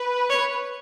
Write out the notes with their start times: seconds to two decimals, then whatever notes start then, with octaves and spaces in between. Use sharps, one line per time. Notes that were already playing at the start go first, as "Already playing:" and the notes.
Already playing: B4
0.30 C#5